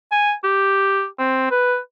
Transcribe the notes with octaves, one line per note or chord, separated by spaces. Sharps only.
G#5
G4
C4
B4